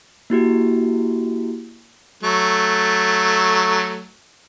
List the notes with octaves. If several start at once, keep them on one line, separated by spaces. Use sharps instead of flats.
A#3 E4 F#4 G4
F#3 A3